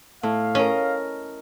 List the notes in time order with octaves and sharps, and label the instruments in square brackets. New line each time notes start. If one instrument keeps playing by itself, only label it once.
[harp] A2 [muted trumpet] F5
[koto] C#4 [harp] A#4 D#5